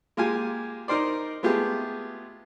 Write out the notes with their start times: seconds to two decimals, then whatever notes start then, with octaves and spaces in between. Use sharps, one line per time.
0.17 G#3 A#3 F4 G4 G#5
0.88 D#4 A#4 C5 D5
1.43 G#3 A3 B3 F4 G4 G#4